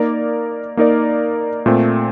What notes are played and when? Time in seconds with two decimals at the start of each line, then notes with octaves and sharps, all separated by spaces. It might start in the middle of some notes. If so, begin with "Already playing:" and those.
Already playing: A#3 D#4 A#4 D5
0.77 A#3 D#4 A#4 D5
1.66 A#2 A3 C4